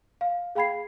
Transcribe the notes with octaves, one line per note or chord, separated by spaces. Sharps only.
F5
G#4 F5 G5 B5 G#6 C7